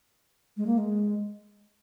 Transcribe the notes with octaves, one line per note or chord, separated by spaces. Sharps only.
G#3
A#3
G#3